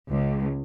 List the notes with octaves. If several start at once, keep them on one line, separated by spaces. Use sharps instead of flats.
C#2